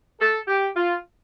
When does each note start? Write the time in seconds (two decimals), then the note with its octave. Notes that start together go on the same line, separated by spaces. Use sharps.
0.20 A4
0.48 G4
0.76 F4